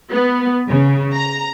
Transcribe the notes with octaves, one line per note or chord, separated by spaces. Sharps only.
B3
C#3
A#5